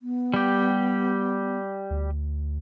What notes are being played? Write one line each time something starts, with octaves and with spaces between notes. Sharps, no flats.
B3
G3 G4
D2